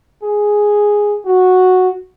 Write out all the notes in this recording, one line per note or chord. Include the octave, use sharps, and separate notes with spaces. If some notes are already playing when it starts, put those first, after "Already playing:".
G#4
F#4